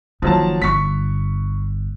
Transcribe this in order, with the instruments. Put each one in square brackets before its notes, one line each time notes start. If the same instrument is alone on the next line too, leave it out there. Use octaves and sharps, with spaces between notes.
[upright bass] F#1 D#3 [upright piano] F3 F#3 A5
[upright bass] G1 [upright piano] C#6 B6